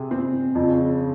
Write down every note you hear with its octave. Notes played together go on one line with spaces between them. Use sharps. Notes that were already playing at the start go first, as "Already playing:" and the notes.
Already playing: C3 G#4
C4
F2 C#3